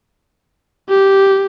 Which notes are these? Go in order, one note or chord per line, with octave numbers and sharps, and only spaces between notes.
G4